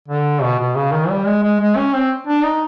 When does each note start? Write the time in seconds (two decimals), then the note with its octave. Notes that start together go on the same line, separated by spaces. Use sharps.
0.08 D3
0.42 B2
0.59 B2
0.75 C#3
0.92 D#3
1.09 G3
1.26 G#3
1.43 G#3
1.60 G#3
1.77 C#4
1.94 C4
2.27 D4
2.43 D#4